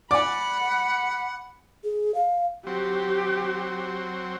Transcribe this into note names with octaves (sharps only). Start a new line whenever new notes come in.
D5 F#5 G#5 B5 D6
G#4
F5
F#3 C4 G4